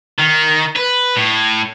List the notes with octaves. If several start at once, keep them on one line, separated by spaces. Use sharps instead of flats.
D#3
B4
A2